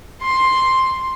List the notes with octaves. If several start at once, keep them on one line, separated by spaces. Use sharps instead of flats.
C6